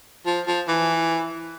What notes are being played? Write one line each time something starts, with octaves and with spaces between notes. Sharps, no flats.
F3
F3
E3